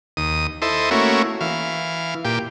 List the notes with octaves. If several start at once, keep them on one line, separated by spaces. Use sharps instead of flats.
D#2 D#6
E4 A4 C5 D#5
A3 A#3 C#4 E4 F#4
E3 F5
A#2 G4